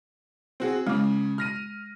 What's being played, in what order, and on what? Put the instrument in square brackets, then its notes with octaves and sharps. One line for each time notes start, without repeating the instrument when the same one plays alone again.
[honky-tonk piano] C4 F#4 G#4
[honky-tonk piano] C#3 [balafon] G#3 D6
[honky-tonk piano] F6 A#6 D#7